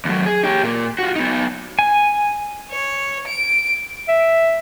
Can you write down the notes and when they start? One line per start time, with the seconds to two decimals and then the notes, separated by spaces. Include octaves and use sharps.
0.05 D#2 F#3
0.26 G#4
0.44 G4 C#5
0.63 A#2 A#3
0.99 F4 F#4
1.16 B3 D#4
1.79 G#5
2.71 C#5
3.27 D7
4.09 E5